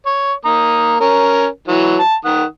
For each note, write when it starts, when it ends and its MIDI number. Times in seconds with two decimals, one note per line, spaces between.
0.06 0.33 73
0.45 0.99 58
0.45 0.99 82
0.45 0.99 87
1.00 1.47 61
1.00 1.47 70
1.68 1.99 52
1.68 1.99 54
1.99 2.15 81
2.25 2.45 51
2.25 2.45 78
2.25 2.45 87